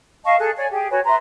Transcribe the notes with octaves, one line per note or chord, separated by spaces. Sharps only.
D#5 F5 A5 C#6
G#4 A4 F#6
C#5 D5 G#5
G4 G#4
F#4 B4 C#5 G#5
B4 E5 A#5 C6